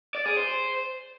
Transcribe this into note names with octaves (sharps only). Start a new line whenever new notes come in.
D5
G#4
C5